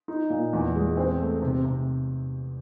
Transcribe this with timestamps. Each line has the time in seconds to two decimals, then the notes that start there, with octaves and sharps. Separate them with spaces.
0.08 D#4
0.30 A#2
0.53 E2
0.75 G#3
0.97 C4
1.20 A3
1.42 C3
1.65 C3